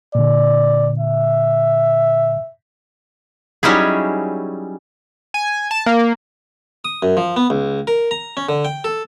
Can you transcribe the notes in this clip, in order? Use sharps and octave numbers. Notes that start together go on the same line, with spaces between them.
A#2 D3 D5
E5
F#3 G3 C#4 D#4 E4 G#4
G#5
A5
A#3
D#6
F#2
F3
B3
C#2
A#4
A#5
C#4
D3
G5
A4